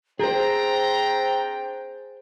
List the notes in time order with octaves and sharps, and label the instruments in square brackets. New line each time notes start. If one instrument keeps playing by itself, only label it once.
[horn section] C4 D4 G5 [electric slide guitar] G#4 C5 [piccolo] A#5